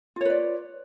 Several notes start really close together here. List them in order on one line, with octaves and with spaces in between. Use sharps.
F4 C#5 B4 D5